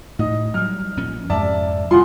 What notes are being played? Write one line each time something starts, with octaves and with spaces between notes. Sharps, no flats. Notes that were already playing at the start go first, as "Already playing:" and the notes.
A2 D#4 D#5
F#3 G3 F6
A#1 A#2 C#4
F2 G#2 C3 D5 E5 A5
E2 C3 G3 F4 F#5 C6